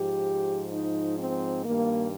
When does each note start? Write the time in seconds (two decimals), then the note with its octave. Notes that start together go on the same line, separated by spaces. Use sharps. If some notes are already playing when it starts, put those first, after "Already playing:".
Already playing: G#2 F3 G4
0.73 D#4
1.19 C4
1.65 G2 D#3 A#3